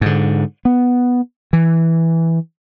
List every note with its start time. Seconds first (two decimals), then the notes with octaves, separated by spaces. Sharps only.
0.01 G#2 D3
0.65 B3
1.53 E3